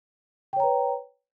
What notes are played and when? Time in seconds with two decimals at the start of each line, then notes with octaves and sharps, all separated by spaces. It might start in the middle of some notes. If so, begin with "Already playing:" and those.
0.53 G5
0.56 C#5
0.60 A#5
0.63 B4